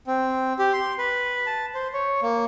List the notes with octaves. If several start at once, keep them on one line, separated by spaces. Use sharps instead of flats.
C4
G4
C6
B4
A5
C5
C#5
A#3